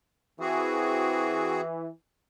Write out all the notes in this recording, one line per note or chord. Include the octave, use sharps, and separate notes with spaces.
E3 C4 F#4 G#4